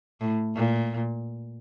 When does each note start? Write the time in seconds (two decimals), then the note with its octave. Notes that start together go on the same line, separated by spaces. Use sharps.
0.21 A2
0.55 A#2